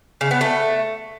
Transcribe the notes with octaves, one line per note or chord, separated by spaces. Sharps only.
C#3
B3
A3